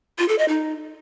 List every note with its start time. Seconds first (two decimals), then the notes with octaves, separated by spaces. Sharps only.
0.19 F4
0.29 A4
0.39 D#5
0.49 D#4